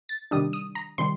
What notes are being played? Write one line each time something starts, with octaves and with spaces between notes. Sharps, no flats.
A6
C3 D#3 G3 D4 D#6
D#6
A#5
C3 D#3 G3 C6